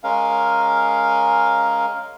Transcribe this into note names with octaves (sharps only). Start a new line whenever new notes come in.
G#3 C#4 A#4 F5